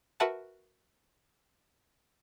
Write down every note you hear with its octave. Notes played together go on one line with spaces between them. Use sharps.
F#4 A#4 B4 E5 F#5 A5